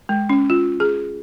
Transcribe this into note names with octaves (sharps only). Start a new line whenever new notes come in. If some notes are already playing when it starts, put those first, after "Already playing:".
G#3
C#4
F4
G#4